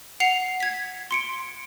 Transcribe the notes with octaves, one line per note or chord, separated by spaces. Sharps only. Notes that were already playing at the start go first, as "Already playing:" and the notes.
F#5 C7 F7
G#6 B6
C6 C#7 D7